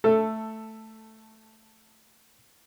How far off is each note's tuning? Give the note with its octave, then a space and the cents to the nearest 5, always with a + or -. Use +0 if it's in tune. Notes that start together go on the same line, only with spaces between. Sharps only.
A3 +0 A4 +10